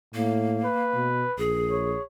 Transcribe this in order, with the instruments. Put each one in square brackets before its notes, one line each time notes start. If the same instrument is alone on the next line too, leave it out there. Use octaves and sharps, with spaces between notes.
[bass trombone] A2 [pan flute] A#3
[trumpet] B4
[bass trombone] B2
[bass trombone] A#1 [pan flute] G#4
[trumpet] C#5